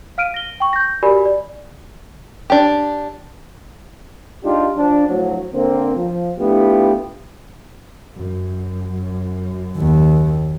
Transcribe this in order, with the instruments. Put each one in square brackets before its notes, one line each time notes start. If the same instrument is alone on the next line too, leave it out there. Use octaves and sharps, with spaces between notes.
[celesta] F5 F6 D7 D#7
A#6 G7
G5 C#6
G6 A#6
F#4 G4 A#4 D5 G#5 B5
D5
[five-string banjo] D4 G4
[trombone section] G#3 D4 D#4 F4 G4
F3 D4
D2 A2 F3 F#3
D3 A#3 C4
F3
A3 B3 D4 E4 F4 G4
[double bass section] F#2
[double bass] D#2